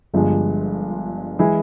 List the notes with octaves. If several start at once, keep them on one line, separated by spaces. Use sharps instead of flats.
G1 G2 F3 G#3
E3 G#3 E4